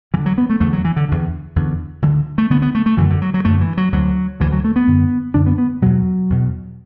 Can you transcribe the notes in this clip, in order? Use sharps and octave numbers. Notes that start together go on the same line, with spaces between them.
E2 D3 E3
F#3
B3
A3
E2 D3 A3
F#3
E3
D3
E2 D3
E2 D3
D2 D3 E3
A3
D2 D3 B3
B3
A3
A3
F#2 D3 E3
D3
F#3
F#3
F#2 D3 A3
E3
F#3
D2 D3 F#3
D2 D3 E3
F#3
A3
B3
F#2 D3
F#2 D3 D4
B3
B3
E2 B2 F#3
E2 B2